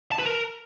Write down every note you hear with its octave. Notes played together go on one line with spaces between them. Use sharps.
A5
B4
A#4